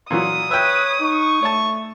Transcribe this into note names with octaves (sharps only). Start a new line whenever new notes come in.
A#2 E3 F#3 D#6
B4 C#5 E5 G5
D#4 C#6
A3 C#5 A5